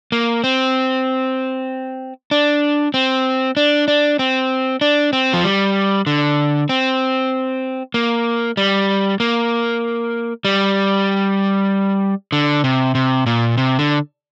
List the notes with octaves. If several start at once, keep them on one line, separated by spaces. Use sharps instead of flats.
A#3
C4
D4
C4
D4
D4
C4
D4
C4
F3
G3
D3
C4
A#3
G3
A#3
G3
D3
C3
C3
A#2
C3
D3